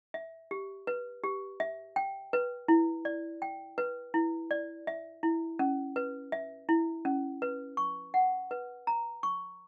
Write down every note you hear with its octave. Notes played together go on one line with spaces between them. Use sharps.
E5
G4
B4
G4
E5
G5
B4
E4
D5
G5
B4
E4
D5
E5
E4
C#4
B4
E5
E4
C#4
B4
C#6
F#5
B4
A#5
C#6